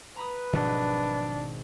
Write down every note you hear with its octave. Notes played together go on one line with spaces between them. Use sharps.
B4 A#5 B5 D#6
G#1 B2 D#3 F3 F#3 D4